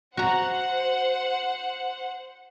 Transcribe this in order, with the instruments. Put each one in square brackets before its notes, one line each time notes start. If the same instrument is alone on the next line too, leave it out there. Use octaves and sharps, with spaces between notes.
[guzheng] F#4 A#5 [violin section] C5 F#5